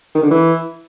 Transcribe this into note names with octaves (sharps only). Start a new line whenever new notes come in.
D#3
D3
E3